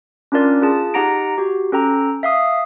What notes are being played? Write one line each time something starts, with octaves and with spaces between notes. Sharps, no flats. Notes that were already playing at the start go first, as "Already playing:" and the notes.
C#4 D4 F4 A#4 D5
F4 G#4 A5
D#4 G4 F#5 A#5 A#6 D7
F#4 G4
C#4 A4 G5 A#5
E5 F5 D#6